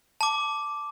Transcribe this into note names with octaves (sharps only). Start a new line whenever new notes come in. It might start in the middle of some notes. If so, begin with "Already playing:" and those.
A5 D6